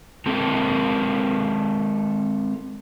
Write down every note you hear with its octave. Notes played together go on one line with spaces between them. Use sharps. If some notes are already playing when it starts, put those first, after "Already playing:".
G#3 C4 A4 A#4